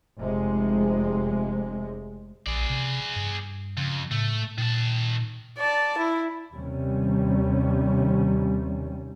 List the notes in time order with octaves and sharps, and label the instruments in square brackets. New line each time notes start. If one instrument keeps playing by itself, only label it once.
[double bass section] F1 C3 G#3
[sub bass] A#1 [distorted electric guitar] G#4 D5
[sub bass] C3
G2
[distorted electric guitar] F2 [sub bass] C#3
[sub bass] A2 [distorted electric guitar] A3
[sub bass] A#2 [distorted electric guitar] D#3 A5
[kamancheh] D5 A5
E4
[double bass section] D#2 C3 G3 C#4